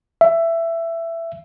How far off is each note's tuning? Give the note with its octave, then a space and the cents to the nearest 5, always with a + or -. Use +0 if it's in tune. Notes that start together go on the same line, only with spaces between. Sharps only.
E5 +15